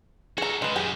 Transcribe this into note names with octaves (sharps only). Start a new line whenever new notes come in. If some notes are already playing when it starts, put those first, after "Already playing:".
F#4 G#4 A4 A#5
C#3 G#3 B4
F#2 C#3 G4 G#4